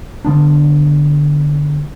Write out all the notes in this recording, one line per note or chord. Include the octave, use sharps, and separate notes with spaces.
D3 B3 D4